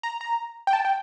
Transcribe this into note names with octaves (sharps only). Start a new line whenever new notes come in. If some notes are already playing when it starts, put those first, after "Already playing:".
A#5
A#5
G5
A5
G5